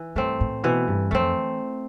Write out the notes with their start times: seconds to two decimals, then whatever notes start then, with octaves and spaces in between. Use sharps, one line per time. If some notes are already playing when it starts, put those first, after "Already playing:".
Already playing: E3
0.16 G2 A3 C4
0.41 A2
0.63 B2 E3
0.87 G2
1.11 F2 A3 C4